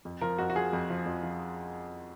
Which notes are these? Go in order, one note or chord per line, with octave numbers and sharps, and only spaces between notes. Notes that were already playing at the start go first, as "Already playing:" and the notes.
F2
F3 A#4
F2 F#4
F#4
F3 G#4
F2
F3
F2
F3